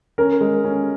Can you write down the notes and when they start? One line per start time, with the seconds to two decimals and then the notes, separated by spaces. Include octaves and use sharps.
0.18 C#4 A#4
0.41 G#3
0.65 C#4